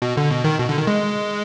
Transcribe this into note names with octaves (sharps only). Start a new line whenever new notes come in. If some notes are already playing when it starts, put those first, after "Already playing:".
B2
D3
B2
D#3
B2
D3
D#3
G#3